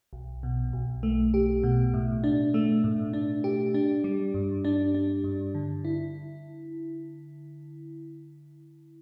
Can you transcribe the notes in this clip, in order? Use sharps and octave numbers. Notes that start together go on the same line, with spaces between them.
B1
B2
B1
A3
G4
B2
A2
D4
A3
A2
D4
G4
D4
G3
G2
D4
D4
G2
D3
E4